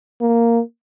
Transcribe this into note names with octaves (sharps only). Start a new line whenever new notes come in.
A#3